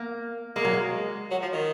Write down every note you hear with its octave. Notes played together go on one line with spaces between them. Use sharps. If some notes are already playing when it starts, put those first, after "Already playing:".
Already playing: A#3
G#3 A#3
F#3
G#3
F#3
F3
D#3